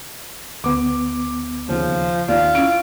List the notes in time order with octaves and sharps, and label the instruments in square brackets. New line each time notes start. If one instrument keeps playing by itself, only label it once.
[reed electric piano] D2 B3 [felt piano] D6
[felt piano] D#2 C#3 [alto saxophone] F3
[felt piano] D#2 [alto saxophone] F4 [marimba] D5
[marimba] C#4 E4 [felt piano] D7